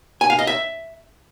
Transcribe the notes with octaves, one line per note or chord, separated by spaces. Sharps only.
G#5
F5
D#5
E5